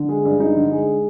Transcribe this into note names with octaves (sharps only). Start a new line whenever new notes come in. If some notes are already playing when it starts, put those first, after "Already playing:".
Already playing: D3
G#3
G2
D#4
D3
G#3